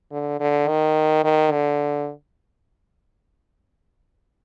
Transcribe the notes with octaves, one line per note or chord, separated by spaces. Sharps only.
D3
D3
D#3
D#3
D3